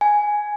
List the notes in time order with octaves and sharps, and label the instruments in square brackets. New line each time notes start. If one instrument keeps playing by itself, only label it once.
[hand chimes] G#5